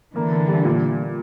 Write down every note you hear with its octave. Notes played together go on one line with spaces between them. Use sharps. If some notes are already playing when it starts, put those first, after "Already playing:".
D3 E3 A#3
A#3
G3
A#2